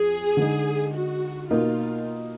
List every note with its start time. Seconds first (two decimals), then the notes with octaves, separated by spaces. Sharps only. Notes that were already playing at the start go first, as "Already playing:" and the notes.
Already playing: F2 G#4
0.37 D3 G#3 D#4
0.94 F#4
1.51 B2 A#3 D#4 F4 A#4